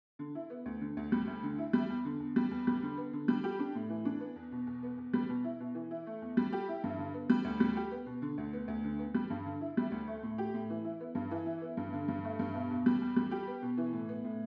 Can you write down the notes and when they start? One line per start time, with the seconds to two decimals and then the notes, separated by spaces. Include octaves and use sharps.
0.19 D3
0.35 E4
0.50 B3
0.66 D2
0.81 D3
0.97 D2
1.12 G3
1.28 D2
1.43 D3
1.58 E4
1.73 G3
1.90 E2
2.05 D3
2.20 E2
2.36 G3
2.51 E2
2.67 G3
2.83 D3
2.97 B3
3.13 D3
3.28 G3
3.44 G4
3.59 D4
3.75 A2
3.89 E3
4.05 D4
4.20 B3
4.36 E2
4.52 B2
4.67 E2
4.83 B3
4.98 E2
5.13 G3
5.29 B2
5.44 E4
5.60 B2
5.75 E3
5.91 E4
6.07 A3
6.22 E2
6.37 G3
6.53 G4
6.68 E4
6.84 G2
6.98 D3
7.14 B3
7.30 G3
7.45 D2
7.60 G3
7.76 G4
7.91 B3
8.06 B2
8.22 D3
8.38 D2
8.53 B3
8.68 D2
8.84 D3
8.99 B3
9.14 G3
9.30 G2
9.46 D3
9.61 E4
9.77 G3
9.92 D2
10.08 A3
10.23 A2
10.38 G4
10.54 A2
10.70 E3
10.85 E4
11.00 B3
11.15 G2
11.31 E3
11.46 E4
11.62 B3
11.77 G2
11.93 D3
12.08 G2
12.24 A3
12.39 G2
12.55 B2
12.70 E2
12.86 G3
13.01 E2
13.16 G3
13.31 G4
13.47 B3
13.62 B2
13.77 E3
13.93 A2
14.09 B3
14.24 A2